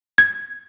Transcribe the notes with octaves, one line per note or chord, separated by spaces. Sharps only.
G#6